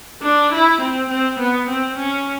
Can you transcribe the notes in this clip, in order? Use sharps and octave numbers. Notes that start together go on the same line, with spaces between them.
D4
E4
C4
C4
B3
C4
C#4